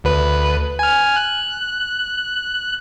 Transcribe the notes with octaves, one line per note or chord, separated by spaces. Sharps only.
D2 B4
G#5 F6
F#6